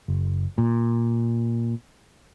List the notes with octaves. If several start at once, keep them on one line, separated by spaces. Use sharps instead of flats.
F#1
A#2